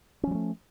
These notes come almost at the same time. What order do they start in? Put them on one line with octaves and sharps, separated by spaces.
C#4 F3 G3 A3